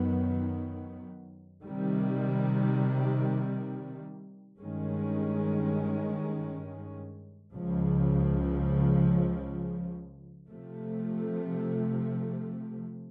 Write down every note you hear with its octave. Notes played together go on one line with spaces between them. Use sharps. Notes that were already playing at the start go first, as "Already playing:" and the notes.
Already playing: F#2 D#3 F#3 B3
C3 D#3 G3
G2 D#3 G#3 C#4
C#2 C#3 F3
C3 F3 A3